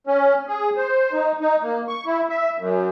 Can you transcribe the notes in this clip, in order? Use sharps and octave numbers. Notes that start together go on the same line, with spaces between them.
C#4
G#4
C5
D#4
D#4
A#3
C#6
E4
E5
F#2